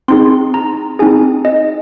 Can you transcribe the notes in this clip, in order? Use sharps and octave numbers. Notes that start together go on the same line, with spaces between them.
C4 D#4 G#4 C6
A#5
C4 D#4 G#4 G#5
D#5